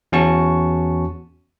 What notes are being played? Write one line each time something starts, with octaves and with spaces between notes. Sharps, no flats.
E2 C#4 F#4 A5 C#6